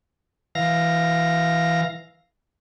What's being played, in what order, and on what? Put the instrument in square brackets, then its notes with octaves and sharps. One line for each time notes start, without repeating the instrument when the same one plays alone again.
[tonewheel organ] E3 F5 A#6